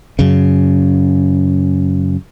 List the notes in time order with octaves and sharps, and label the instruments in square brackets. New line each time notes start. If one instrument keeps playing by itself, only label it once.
[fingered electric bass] F#2 C#3